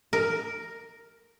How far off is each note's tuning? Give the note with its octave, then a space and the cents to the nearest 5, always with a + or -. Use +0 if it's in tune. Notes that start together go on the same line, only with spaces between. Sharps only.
A#4 +0